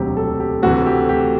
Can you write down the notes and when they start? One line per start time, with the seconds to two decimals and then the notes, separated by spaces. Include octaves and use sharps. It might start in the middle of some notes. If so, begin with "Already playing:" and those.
Already playing: E1 D2 C3 F#3 F#4 G4
0.17 A4
0.40 G4
0.63 D2 C3 E3 A3 F#4
0.86 G4
1.09 G4